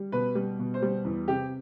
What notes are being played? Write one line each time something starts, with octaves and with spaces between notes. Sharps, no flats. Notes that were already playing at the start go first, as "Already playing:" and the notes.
Already playing: G3
B2 B4
G3
B2
C5
G3
E2
C3 G4